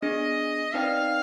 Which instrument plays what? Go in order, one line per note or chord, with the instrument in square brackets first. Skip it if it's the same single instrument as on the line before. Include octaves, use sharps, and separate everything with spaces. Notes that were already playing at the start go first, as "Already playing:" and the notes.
[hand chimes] B3 D4 G#4 [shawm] D#5
[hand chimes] C4 D#4 B4 D5 G5 [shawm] F5